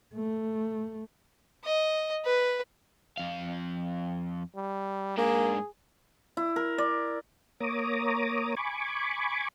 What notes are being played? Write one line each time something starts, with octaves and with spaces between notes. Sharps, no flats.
A3
D#5
B4
F2 F5
G3
G#2 A#3 D4 G#4
E4
A#4
D5
A#3 C#5 A#5 D6 D#6
G#5 B5 C#6 D6